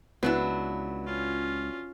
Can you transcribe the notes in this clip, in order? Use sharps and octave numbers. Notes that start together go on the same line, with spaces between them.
C#2 F#3 B3 D4 E4
C#4 F4